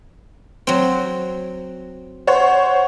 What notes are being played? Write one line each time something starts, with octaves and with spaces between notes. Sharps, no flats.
F#3 C4
C5 C#5 F#5